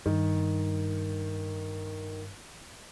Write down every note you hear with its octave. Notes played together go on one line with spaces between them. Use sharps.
G2 D#3